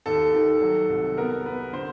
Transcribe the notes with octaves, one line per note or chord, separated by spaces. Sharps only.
D#2 A4
D#3
F#3
C2
B3 A#4
B3 B4
D3 C5